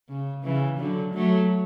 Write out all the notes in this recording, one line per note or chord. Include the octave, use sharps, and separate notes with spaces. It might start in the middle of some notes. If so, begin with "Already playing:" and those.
C#3
C#3 E3
D3 F#3
F#3 A3